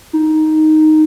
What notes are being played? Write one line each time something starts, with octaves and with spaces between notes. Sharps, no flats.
D#4